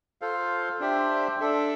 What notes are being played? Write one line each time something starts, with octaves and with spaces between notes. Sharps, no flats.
F4 A4 C5 F5
D4 G4 C5 E5
D4 A4 E5